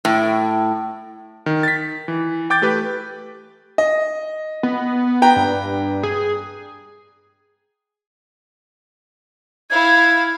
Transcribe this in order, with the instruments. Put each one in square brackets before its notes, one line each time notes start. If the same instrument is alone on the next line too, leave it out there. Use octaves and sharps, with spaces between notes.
[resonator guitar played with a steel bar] A2
[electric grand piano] D#3
A6 B6
E3
G5 D6 G6 A6
A3 G4 B4
[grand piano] D#5
[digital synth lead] B3
[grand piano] B4 G5 A#5
[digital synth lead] G2
G#4
[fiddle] E4 F5 [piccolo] G#6